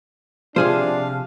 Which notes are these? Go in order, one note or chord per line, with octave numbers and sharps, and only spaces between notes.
C3 F3 D4 G#4 C5 F5